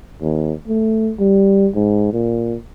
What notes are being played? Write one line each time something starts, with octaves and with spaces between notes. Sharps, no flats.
D#2
A3
G3
G#2
A#2